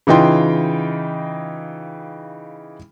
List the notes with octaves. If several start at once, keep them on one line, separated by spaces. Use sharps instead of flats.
C#3 E3 D#4 F4 G5 C6